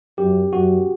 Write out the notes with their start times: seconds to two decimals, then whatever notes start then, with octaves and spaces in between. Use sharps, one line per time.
0.18 F#2 G4
0.53 F#2 F#4